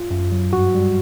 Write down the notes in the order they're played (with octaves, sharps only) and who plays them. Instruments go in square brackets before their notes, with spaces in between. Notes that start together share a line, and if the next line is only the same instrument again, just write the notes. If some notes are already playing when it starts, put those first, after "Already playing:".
Already playing: [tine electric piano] F4
F#2
F#3
G2 F#4
G3